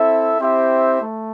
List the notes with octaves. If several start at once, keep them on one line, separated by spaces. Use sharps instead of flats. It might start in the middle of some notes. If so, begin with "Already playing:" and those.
Already playing: C4 E4 A4 E5
C4 E4 G4 C5 E5
A3